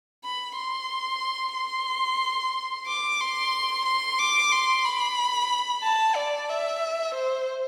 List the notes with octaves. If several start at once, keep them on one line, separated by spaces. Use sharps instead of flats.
B5
C6
C6
D6
C6
C6
D6
C6
B5
A5
D5
E5
C5